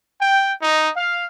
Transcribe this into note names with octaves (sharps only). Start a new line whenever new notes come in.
G5
D#4
F5